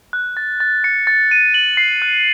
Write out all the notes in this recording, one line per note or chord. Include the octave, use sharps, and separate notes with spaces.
F#6
A6
A6
C#7
A6
D#7
F#7
C7
F#6